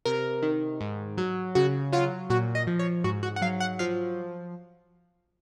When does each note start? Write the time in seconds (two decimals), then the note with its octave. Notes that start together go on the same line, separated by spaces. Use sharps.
0.05 C3 A#4
0.42 D#3
0.81 G#2
1.18 F#3
1.55 C#3 F#4
1.92 F#3 F4
2.30 A#2 F#4
2.55 D#5
2.67 F3
2.79 C#5
3.04 G#2 F#4
3.23 F#4
3.36 F#5
3.42 F#3 F5
3.60 F#5
3.79 F3 F5